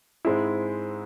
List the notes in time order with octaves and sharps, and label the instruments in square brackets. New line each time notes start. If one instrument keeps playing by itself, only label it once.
[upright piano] G#2 G#3 C4 E4